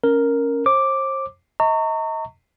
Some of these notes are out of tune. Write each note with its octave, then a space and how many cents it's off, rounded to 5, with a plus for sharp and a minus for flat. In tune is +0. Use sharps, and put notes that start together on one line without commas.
C#4 +0 A#4 +0
C5 +40 D6 +0
D#5 +35 A#5 -35 C#6 +0